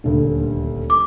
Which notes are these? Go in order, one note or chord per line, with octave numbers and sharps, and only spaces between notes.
D#1 D2
D6